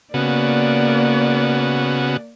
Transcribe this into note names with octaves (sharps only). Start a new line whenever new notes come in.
C#3 A#3 B3 F#4 D5